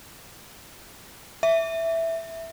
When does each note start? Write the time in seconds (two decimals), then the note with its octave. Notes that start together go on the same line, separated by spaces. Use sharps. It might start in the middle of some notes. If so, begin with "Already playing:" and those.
1.43 E5